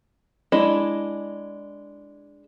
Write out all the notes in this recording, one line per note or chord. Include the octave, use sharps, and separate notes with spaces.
G#3 D4 E4 D#5